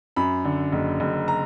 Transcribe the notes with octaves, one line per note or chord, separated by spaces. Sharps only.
F#2 B5
D3
F#1
F#1
A#5